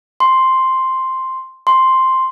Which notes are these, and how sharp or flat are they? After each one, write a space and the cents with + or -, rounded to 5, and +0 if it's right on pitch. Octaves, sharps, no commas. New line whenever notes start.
C6 +0
C6 +0